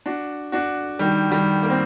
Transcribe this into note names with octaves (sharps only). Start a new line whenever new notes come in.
D4 F#4
D4 F#4
D#3 G3
D#3 G3
A#3
C4